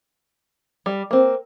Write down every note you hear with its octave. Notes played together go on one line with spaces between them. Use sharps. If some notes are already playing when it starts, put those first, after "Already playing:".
G3
A#3 C4